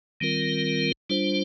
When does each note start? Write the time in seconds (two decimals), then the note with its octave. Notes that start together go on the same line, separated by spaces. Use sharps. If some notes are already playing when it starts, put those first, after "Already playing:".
0.21 D#3 G3 C4 F4 A#4
1.10 G3 D4 F4 C5